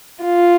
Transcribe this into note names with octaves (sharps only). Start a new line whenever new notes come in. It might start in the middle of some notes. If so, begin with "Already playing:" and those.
F4